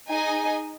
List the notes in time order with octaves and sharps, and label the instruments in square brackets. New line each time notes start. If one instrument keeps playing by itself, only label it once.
[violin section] D#4 G#4 D#5 G#5